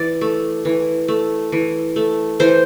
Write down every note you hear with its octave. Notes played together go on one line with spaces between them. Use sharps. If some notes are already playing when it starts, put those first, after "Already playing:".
Already playing: E3 D5
A3
E3
A3
E3
A3
E3 C5